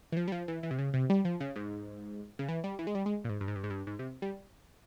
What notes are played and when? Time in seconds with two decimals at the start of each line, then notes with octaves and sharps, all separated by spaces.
0.12 E3
0.17 F3
0.28 G3
0.32 F3
0.48 E3
0.63 E3
0.71 C3
0.79 C#3
0.94 C3
1.10 G3
1.25 F3
1.40 C#3
1.56 G#2
2.39 C#3
2.49 E3
2.64 G3
2.79 E3
2.87 G#3
2.95 G3
3.06 G#3
3.25 A#2
3.29 G#2
3.41 G2
3.48 G#2
3.56 G2
3.64 G#2
3.70 G2
3.87 G#2
3.99 C3
4.22 G3